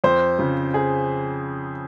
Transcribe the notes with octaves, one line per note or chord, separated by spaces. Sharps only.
F2 C5
C#3 F3
G#4